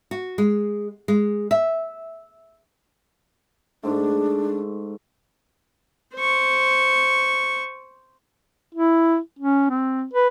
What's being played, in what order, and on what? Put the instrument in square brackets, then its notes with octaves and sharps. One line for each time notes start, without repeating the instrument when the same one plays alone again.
[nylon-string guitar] F#4
G#3
G#3
E5
[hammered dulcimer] G#2 A3 [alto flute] D4
[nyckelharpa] C5 C#6
[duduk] E4
C#4
C4
B4